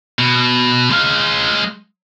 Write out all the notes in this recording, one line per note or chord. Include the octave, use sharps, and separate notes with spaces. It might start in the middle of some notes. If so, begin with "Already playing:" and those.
B2
G#3 F5